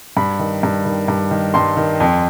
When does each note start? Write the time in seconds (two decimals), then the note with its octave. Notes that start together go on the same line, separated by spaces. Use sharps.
0.17 G2 B5
0.39 D#3
0.63 G2
0.85 D#3
1.08 G2
1.31 D#3
1.54 G2 C6
1.77 D#3
2.00 F2